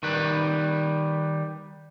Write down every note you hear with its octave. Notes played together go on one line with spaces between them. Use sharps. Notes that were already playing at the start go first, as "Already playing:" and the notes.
D#3 G3 B4